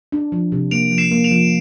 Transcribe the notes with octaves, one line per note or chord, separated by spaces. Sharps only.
D4
F3
C3
A#3 D7 F7
F3
C7 E7
A#3
D7 F7
F3